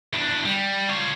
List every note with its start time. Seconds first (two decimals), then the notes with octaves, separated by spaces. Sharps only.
0.13 E2 D4
0.45 G3
0.89 F4 C#5